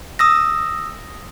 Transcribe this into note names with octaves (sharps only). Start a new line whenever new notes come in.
D#6 E6 A#6